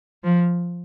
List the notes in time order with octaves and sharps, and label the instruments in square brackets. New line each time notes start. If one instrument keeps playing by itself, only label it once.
[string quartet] F3